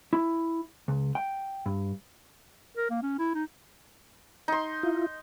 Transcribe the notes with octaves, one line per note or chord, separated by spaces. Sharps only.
E4
C#2
G5
G2
A#4
A#3
C#4
E4
D#4
D#4 C6
E4 F4